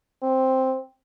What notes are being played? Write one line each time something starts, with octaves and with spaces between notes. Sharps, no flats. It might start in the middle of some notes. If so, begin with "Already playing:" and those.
C4